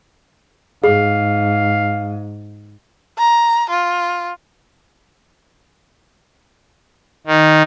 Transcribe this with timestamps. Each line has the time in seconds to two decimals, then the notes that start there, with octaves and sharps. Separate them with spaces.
0.84 G#2 G#4 F5
3.18 A#5
3.70 F4
7.27 D#3